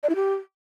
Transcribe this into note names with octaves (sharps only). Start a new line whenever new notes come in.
D5
E4
G4